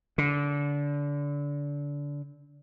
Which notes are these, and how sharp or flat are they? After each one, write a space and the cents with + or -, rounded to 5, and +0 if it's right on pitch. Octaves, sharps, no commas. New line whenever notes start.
D3 -25